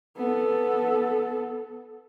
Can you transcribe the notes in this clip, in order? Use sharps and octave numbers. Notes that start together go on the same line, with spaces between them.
B3 A4